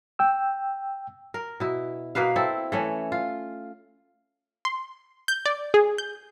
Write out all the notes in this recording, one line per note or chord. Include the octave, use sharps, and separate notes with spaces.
G5 E6
A#4
B2 E4
B2 A#3 B4 F5
C4 E4 A4
E3 A3 C#4
F4
C6
G6
D5
G#4
G6